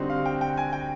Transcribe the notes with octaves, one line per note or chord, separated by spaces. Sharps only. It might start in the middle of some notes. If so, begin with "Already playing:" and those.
Already playing: D3 G3 C4 D#4 F#4
F5
G5
G5
G#5
G5